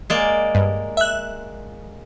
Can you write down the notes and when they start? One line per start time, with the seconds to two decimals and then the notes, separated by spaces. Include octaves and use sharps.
0.10 G#3 A#3 D5
0.55 G2
0.97 E5 F#6